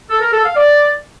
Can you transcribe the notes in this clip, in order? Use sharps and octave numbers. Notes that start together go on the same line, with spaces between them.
A4
A#4
A4
F5
D5